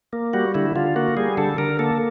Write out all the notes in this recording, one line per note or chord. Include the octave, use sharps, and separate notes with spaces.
A#3
G3 F#4
D3 E4
D3 F4
A#3 F#4
G3 G#4
D3 A4
D3 A#4
A#3 A4